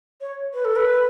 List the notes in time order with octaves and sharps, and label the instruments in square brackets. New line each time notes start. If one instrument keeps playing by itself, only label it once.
[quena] C#5
B4
A4
B4